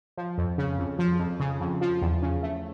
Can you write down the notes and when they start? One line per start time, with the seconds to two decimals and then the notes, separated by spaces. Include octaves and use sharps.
0.17 F3
0.38 F2
0.58 C#3
0.79 F2
0.99 F3
1.19 F2
1.40 C#3
1.61 F2
1.81 F3
2.02 E2
2.22 C#3
2.43 A3